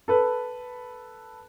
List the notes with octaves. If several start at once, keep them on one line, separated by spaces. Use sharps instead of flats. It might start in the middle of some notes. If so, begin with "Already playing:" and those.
A4 B4